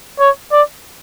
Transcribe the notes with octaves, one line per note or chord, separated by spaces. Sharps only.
C#5
D5